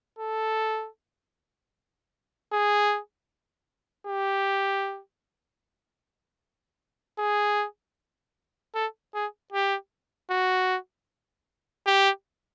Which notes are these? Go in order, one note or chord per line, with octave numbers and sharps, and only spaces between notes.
A4
G#4
G4
G#4
A4
G#4
G4
F#4
G4